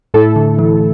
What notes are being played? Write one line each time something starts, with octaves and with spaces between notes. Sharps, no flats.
A2 A3 E4 A4
D3
E3